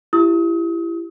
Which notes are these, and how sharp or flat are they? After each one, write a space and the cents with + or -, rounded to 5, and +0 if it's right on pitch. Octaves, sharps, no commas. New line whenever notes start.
E4 +25 G4 +0 D#6 +35